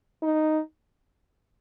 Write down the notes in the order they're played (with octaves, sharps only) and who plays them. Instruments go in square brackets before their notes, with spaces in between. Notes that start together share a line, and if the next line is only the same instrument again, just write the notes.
[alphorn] D#4